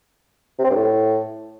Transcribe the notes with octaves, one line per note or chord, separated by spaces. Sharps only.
C3
C4
G2
A2